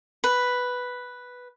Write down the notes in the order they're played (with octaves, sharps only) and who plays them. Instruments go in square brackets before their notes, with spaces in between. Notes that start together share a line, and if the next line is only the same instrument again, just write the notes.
[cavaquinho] B4